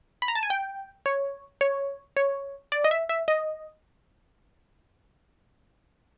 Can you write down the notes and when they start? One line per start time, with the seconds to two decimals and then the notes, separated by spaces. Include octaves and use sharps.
0.22 B5
0.28 A#5
0.35 A5
0.43 G#5
0.50 G5
1.06 C#5
1.61 C#5
2.17 C#5
2.72 D5
2.84 D#5
2.91 E5
3.09 E5
3.28 D#5